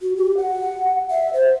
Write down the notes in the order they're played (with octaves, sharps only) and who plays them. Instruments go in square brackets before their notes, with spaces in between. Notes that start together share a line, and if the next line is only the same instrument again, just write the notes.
[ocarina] F#4
G4
F#5
E5
C5